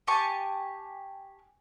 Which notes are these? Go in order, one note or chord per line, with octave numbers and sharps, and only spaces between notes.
G4 G#5 A5 C#6